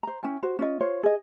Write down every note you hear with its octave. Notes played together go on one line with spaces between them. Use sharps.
C5 A#5
C#4 E4 G5 G#5
F#4 C5
C#4 F4 D#5
F4 C5 C#5
G#4 D#5